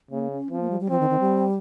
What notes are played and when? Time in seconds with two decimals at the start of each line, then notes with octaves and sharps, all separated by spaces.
0.11 C#3 A#3
0.31 C#4
0.51 F3 C4
0.60 A#3
0.70 G3
0.80 G3
0.90 F3 C4
1.00 D#3
1.10 D#3
1.20 G3